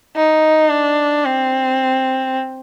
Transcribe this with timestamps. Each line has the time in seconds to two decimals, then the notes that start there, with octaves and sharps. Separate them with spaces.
0.16 D#4
0.70 D4
1.25 C4